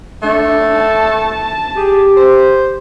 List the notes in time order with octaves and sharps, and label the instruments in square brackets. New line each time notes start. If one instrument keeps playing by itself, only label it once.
[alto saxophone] A3 [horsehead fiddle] D4
[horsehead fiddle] A5
[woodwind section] G4 [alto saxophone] G#4
[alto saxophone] C5